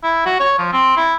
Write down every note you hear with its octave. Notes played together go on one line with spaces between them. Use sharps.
E4
F#4
C#5
F3
C4
E4